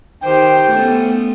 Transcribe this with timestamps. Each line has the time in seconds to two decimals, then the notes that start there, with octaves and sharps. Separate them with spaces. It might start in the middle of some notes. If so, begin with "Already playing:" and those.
0.23 D#3 G4 C5 G5
0.70 A3 B3 C#4